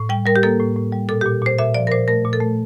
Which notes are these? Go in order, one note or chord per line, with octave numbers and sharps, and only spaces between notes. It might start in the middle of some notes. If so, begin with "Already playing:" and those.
Already playing: A2
G3 G5
G3 A#4
G4
A#3 A4
A2
A2
G3
A#2 A4
G4
A#2
A#2 C5
A#2 E5
F3 D5
A#4
A#2 C5
A3 A#4
A#2
A4
A3